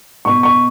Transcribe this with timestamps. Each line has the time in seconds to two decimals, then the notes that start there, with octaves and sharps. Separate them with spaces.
0.25 B2 C#6
0.43 C#6